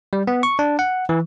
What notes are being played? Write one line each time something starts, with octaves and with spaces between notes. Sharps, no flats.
G3
B3
C#6
D4
F#5
E3